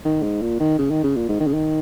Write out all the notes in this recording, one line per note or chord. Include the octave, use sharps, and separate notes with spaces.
D#3
G#2
A#2
D#3
C#3
D#3
C#3
A#2
G#2
D#3
C#3
D#3